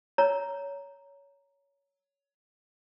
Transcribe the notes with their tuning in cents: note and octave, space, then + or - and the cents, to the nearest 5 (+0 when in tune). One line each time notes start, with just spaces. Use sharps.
C#5 +15 A#5 +0